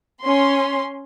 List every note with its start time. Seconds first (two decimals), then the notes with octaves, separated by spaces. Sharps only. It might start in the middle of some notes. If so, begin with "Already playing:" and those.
0.23 C#4 C6